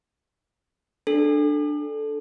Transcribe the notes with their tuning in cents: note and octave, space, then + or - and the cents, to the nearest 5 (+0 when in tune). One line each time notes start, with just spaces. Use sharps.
D4 +15 A4 -5